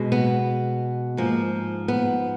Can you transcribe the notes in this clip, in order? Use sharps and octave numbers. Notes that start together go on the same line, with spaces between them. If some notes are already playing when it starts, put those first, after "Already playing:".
Already playing: B2 G#3
B3
G#2 F3 A#3
B3